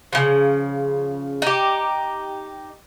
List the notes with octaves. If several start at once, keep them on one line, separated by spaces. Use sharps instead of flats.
C#3 F3
D#4 G4